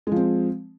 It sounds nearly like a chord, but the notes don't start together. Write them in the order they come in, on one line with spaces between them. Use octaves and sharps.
G#3 F3 C4